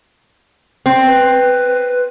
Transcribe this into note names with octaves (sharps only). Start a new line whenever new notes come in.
C4
B4